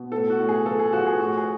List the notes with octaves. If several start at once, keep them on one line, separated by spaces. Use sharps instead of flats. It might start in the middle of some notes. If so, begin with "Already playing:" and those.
Already playing: B2
A2 A4
F#4
A2
G#4
F3 A4
G#4
F3 F#4
G#4
A2 F#4
G#4